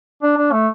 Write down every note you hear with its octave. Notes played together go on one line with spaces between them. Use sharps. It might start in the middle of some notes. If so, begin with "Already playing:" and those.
D4
D4
A3